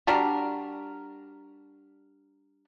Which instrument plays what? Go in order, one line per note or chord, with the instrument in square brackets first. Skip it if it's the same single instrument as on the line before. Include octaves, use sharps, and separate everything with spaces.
[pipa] G3 D4 F#4 A#4